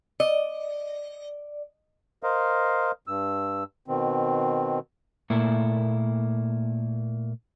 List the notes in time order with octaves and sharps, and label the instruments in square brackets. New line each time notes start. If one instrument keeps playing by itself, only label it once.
[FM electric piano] D5 [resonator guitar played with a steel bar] D#5
[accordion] A#4 C5 D#5 F5
G2 E6
B2 D#3 C4
[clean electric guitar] A#2 A3 A#3 E4